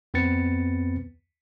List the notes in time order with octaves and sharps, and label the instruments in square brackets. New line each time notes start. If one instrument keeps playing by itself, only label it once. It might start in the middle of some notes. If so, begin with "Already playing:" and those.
[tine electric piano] F2 B3 C4 B4 A6 C#7